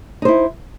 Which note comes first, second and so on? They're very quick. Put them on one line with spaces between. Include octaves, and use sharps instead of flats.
D#4 C5 E4